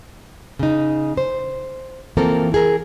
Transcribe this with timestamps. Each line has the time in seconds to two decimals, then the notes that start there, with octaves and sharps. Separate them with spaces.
0.59 C#3 D#4
1.17 C5
2.17 E3 F3 A#3 C4 A4 A#4
2.52 E4 G#4 A#4